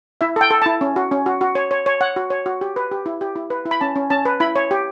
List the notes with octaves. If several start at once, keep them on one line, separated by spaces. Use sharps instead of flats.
E4 E5
A4 G5
A4
E4 A5
C#4
F#4
C#4
F#4
F#4
C#5
C#5
C#5
C#5 F#5
F#4
C#5
F#4
G4
B4
G4
E4
G4
E4
B4
E4
B5
C#4 A5
C#4
C#4 A5
B4
E4 B5
C#5
G4